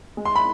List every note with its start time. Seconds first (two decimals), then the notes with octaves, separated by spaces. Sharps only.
0.17 G#3
0.25 C6
0.36 B5